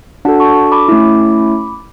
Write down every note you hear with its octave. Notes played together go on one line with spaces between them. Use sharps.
D4 F#4 A4 F#5 A5
A5 C#6
B5 D6
A3 C#4 E4